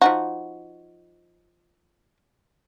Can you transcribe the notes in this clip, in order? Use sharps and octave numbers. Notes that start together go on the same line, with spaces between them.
F3 D#4 F#4